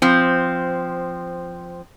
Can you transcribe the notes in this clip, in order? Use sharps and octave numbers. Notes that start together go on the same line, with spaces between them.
F3 C4